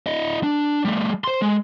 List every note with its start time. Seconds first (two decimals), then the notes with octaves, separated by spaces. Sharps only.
0.06 E4 D#5
0.43 D4
0.85 G3 A3
1.24 C5 C6
1.42 G#3